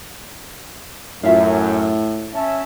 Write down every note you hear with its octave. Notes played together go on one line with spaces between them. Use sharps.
F#2 A2 F4 E5 F5
C#4 E5 A5